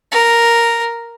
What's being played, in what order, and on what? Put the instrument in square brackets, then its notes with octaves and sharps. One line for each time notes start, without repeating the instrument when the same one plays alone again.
[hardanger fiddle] A#4